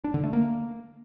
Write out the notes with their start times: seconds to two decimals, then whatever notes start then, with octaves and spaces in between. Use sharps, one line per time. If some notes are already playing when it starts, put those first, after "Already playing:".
0.04 D4
0.14 D3
0.23 A3
0.33 A#3